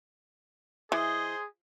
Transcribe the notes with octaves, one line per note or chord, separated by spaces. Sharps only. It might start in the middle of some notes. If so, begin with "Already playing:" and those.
E3 G#4 C5 D#5